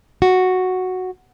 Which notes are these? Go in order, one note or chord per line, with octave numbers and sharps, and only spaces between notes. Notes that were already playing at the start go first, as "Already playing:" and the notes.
F#4